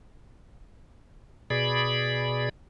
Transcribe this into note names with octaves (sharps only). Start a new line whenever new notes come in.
B2 G#4 D5 B5